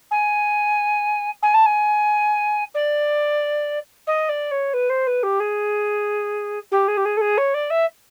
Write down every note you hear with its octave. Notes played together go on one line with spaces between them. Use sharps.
G#5
G#5
A5
G#5
D5
D#5
D5
C#5
B4
C5
B4
G4
G#4
G4
G#4
G4
G#4
A4
G#4
C#5
D5
E5